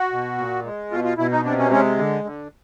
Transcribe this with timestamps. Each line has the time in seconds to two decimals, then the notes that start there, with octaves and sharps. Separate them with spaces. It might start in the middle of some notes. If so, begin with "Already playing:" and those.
Already playing: F#4
0.12 B2
0.38 A#2
0.65 G#3
0.91 B2 F4
1.04 F4
1.18 B2 E4
1.32 D#4
1.44 C3 D4
1.58 C#4
1.71 G#3 C#4
1.98 D3
2.24 D3